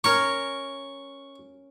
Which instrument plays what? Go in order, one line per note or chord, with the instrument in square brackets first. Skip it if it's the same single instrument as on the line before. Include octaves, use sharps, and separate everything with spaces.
[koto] C#4 A#4 C#5 [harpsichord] C#6